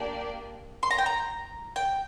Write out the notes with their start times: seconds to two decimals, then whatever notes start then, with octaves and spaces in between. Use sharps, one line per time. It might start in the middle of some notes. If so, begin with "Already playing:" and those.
Already playing: A#3 D4 G4 D5
0.83 C6
0.91 A#5
0.98 G5
1.06 A#5
1.76 G5